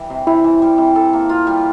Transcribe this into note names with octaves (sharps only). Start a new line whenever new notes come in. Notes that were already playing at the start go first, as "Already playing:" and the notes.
Already playing: E3 G3
C3
C3 E4
E3
G3
C3
A4
A#3
F4
G3